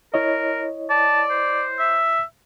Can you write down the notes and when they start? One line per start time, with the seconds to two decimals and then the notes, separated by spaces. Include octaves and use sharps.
0.14 E4 A#4 C#5 D#5
0.90 D5 A5
1.30 C5
1.79 E5